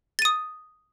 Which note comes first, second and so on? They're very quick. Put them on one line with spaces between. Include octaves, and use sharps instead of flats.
A6 D#7 D#6